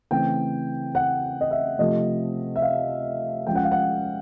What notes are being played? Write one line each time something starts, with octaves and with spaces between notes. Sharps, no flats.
C#3 E3 A3 C4 G5
F#5
D#5
E5
C3 F3 A3 D#5
E5
F5
F3 G#3 C#4 G5
F#5
F5
F#5